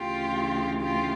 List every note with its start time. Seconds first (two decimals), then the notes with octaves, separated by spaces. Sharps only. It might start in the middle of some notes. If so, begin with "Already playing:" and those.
Already playing: D2 C#3 E3 F4 G4
0.80 F4 G4